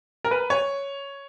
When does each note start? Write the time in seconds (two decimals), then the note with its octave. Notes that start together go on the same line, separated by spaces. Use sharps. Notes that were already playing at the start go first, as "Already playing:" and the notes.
0.25 A#4
0.31 B4
0.50 C#5